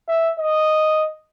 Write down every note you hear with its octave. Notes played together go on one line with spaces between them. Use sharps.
E5
D#5